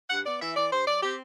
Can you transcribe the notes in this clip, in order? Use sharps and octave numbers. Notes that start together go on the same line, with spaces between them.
G2 F#5
B3 D5
E3 E5
E3 D5
G2 C5
F#3 D5
C4 G4